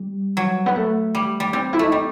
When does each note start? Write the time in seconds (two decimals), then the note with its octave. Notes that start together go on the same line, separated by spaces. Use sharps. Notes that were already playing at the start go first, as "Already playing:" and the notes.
Already playing: G3
0.37 F#3
0.66 B3
0.76 A3
1.15 G3
1.40 G3
1.53 G3 C4
1.73 E4
1.79 A3 D#4
1.92 G3 C4